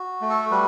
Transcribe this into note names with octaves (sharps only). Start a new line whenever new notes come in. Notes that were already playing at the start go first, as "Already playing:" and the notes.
Already playing: F#4
A3
A4
G3 B4